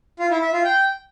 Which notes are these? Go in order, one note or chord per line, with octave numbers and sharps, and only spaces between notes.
F4
E4
E5
F4
G5